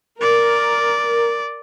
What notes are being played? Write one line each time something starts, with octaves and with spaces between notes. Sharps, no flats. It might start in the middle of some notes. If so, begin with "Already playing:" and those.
A#4 D5